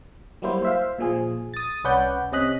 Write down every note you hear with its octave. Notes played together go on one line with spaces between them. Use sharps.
F#3 G3 A#3 E4 C5
C5 E5 F5
A#2 F3 G#4
D#6 A6
C2 C#4 B4 D5 F#5 G6
C3 C#4 D#5 F#6 B6